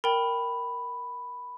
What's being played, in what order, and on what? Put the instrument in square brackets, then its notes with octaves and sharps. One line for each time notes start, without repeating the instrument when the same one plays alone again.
[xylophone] A#4 G5 [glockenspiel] B5